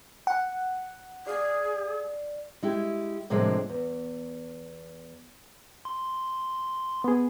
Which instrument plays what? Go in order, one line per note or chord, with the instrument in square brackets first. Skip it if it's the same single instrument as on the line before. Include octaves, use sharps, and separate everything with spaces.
[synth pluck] F#5
[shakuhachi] G#4 [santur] D5 F5
[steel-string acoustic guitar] G#3 E4 G4
A2 C3 F3 G#3 A#3 D4
E2
[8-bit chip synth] C6
[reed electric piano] B3 G#4